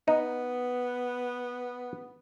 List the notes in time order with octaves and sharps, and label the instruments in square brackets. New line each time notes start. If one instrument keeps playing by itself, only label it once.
[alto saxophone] B3 [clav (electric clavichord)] D#4